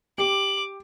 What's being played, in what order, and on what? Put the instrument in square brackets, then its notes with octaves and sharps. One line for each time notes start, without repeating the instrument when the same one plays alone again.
[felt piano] G4 [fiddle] D6 [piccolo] F#7